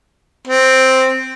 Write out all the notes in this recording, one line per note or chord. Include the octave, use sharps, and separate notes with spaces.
C4